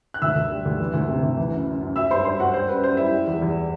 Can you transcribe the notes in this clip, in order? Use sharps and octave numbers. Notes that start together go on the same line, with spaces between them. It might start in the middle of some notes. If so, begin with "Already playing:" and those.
F#6
D2 E5 E6
D2
G3
D2
E3
D2
C3
D2
E3
F#2
F#2
F#2
F#3 E5 E6
G2 C5 C6
G2 C5 C6
F#3 F#4 F#5
G3 C5
F#2 B4
F#2 C5
G3 E4 E5
G3
E2
E2